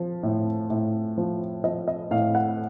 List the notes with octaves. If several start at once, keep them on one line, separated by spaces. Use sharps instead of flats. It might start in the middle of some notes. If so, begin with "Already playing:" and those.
Already playing: F3
A2
A2
F3
F3 D#5
D#5
A2 F5
F#5